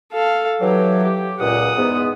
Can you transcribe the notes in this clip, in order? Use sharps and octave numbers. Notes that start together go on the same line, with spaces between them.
A4 F5
E3 F#3 G4
G4
C#2 A#2 F#5 D#6
E2 G#2 B3